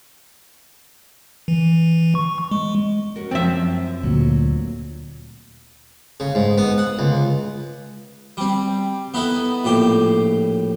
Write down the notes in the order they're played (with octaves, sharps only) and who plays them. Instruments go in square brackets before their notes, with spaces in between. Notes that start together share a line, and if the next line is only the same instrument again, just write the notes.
[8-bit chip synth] E3
C#6
G#3
[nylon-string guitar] C#4 F#4 A#4
[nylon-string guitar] F#2 F3 [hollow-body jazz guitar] C4 E5
[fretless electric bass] D2 A#2 [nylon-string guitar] F#3
[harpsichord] C#3
G#2
B3
F#5
C#2
G3 C4
B3 D#4 E4 A4
A#1 A2 G4 C5